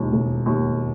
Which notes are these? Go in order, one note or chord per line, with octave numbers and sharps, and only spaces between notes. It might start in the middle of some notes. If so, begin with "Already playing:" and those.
Already playing: E1 D#2 D#3
E1
D#2 D#3